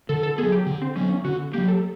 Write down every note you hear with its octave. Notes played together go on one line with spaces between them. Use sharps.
D3 A4
A4
F#3 B3 G#4
G4
D3
C4
F#3 B3 C#4
C#4
D3 F#4
F#3 A#3 G4
A4